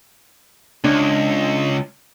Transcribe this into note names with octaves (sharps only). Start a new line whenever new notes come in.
C#2 D4